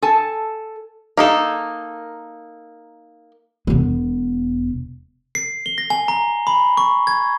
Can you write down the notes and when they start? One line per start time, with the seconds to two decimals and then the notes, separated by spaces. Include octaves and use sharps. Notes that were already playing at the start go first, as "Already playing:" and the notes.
0.02 A4 G#5 A5
1.17 A#3 D#4 A4
3.67 E1 B3
5.35 C7
5.66 G7
5.78 A#6
5.90 G#5
6.08 A#5
6.47 B5
6.77 C#6
7.07 G#6